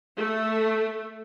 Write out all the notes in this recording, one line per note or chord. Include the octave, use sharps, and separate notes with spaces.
A3